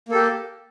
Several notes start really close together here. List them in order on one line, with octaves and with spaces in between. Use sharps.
A#3 A4 G4